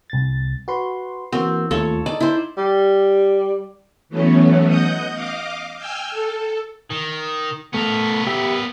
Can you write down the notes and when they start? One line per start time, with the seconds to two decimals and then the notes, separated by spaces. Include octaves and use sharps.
0.10 C2 A6
0.68 F#4 B4 C6
1.32 E3 A#3 C4 F#4
1.71 D#2 A3 F4 A4 C#5
2.06 D#4 D5
2.20 E4 C5
2.57 G3
4.09 E3 F#3 A3 B3 C#4
4.67 D#5 F#5 D#6 G6
5.11 D#5 F5 D6
5.77 G5 G#5 E6 F6 G6
6.11 A4
6.90 D#3
7.74 A3 B3 A#4
8.27 G4 E5